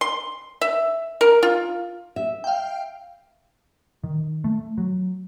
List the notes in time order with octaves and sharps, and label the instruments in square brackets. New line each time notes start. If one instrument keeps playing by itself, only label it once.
[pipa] C6
E5
A#4
F4
[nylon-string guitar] E5
[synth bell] F5 G5
[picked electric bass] D#3
A3
F#3